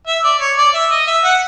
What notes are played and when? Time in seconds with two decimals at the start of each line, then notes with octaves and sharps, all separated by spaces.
0.07 E5
0.24 D5
0.41 C#5
0.57 D5
0.74 E5
0.91 D#5
1.07 E5
1.24 F#5